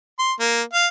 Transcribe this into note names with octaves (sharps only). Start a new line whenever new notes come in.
C6
A#3
F5